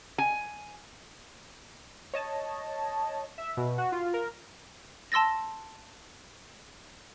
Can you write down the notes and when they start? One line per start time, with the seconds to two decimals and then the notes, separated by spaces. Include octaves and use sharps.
0.18 G#5
2.14 C#5 D#5 A5
3.38 E5
3.57 B2
3.78 F#4
3.92 F4
4.14 A#4
5.12 A5 C6 E6 A6 A#6